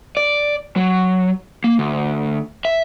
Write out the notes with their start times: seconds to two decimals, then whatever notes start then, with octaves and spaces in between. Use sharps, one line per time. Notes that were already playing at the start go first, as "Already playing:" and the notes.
0.17 D5
0.76 F#3
1.64 A#3
1.79 D2
2.65 E5